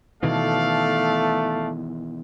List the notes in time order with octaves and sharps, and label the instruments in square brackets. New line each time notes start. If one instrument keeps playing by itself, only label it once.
[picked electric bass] B2 D#3 E3 [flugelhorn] A3 [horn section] A4 D5 F5